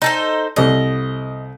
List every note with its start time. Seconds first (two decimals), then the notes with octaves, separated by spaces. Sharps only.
0.02 D#4 A4 C5
0.56 C2 A3 D#5